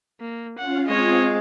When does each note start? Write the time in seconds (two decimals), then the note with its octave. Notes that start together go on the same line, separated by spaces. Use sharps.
0.21 A#3
0.59 C#4 F4 F5 F#5
0.88 G#3 C4 F4 C#5 D#5 F5